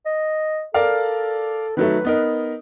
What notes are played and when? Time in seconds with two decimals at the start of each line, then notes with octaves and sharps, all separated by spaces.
0.06 D#5
0.74 A4 A#4 D5 F5
1.77 D#3 F#3 A3 B4
2.05 B3 D#4 A#4